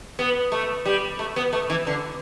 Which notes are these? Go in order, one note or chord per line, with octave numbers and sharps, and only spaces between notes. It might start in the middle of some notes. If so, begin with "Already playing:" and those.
B3
A3
G3
A3
B3
A3
E3
D3